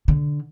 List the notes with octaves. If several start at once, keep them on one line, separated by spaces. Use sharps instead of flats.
D3